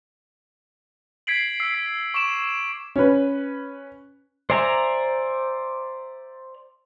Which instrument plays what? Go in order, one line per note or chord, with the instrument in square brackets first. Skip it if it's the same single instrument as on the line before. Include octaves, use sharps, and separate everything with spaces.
[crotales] G#6 B6 C7 D7 F#7
E6 C7
B6
C#6 D6 D7 E7
[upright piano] C#4 B4
[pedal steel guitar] C5 D5 E5 G#5 A#5